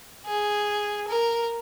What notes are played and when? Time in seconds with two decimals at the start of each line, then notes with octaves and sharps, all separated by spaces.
0.26 G#4
1.08 A#4